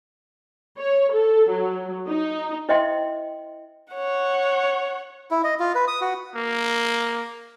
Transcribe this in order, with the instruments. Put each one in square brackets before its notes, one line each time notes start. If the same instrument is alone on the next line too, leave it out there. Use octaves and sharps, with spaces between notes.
[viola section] C#5
A4
F#3
D#4
[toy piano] E4 C5 D#5 E5 G5 C6
[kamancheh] C#5 F#5
[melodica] E4
D#5
F4
B4
D#6
F#4
[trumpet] A#3